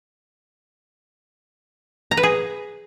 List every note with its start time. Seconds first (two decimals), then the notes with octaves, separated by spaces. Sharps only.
2.11 A#5
2.17 B4
2.23 G#4